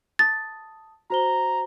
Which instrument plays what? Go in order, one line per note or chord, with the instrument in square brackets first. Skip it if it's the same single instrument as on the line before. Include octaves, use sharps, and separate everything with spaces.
[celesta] A5 D#6 [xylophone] A6
[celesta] F#4 C5 G7 [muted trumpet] A#5